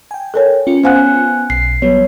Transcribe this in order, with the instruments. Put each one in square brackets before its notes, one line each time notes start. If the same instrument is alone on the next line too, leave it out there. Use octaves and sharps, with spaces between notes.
[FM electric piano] G5 G#5
[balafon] A4 A#4 C#5
[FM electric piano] C#4 F4 C#7
[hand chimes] B3 G#5 F#6 [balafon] C5 F5 F#5
[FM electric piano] B1 [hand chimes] C7
[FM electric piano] F#3 G3 B3 [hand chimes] C#5